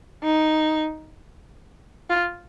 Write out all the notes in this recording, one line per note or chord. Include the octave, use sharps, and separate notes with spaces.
D#4
F4